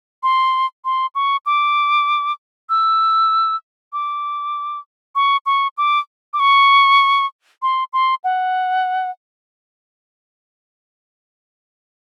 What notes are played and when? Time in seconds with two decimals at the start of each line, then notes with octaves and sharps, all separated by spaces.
0.23 C6
0.85 C6
1.15 C#6
1.46 D6
2.69 E6
3.93 D6
5.15 C#6
5.46 C#6
5.78 D6
6.33 D6
6.40 C#6
7.62 C6
7.93 C6
8.24 F#5